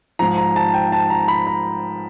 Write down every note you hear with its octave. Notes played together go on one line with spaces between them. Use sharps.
G#2 F3 A#5
A#5
A5
G5
A5
A#5
B5
A#5